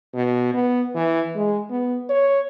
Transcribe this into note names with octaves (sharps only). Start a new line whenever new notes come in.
B2
B3
E3
G#3
B3
C#5